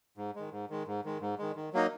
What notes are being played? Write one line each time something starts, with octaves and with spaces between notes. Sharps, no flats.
G#2
D#3 G#3
G#2
D#3 G#3
G#2
D#3 G#3
G#2
D#3 G#3
D#3
F#3 A#3 D#4